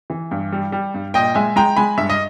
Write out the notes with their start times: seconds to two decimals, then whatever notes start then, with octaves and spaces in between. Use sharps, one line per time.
0.10 E3
0.31 G2
0.52 G3
0.72 G3
0.94 G2
1.14 A#2 D#5 G5
1.35 G#3 E5 G#5
1.56 G#3 G5 A#5
1.77 G#3 G#5 B5
1.97 G2 E5
2.10 D#5